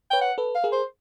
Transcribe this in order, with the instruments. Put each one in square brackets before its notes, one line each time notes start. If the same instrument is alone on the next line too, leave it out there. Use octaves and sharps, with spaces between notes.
[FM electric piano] B4 C#5 [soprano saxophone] G5
[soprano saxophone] F#5
[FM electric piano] A4 B4
[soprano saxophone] F5
[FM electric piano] G#4 A#4
[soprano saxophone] C5